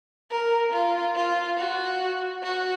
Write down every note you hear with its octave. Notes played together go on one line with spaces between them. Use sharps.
A#4
F4
F4
F#4
F#4